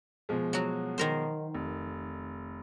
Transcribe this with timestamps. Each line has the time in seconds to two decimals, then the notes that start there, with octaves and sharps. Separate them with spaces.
0.29 B2 F3 G#3
0.53 F#3 F#4
0.98 D#3 A#4 C5
1.55 F1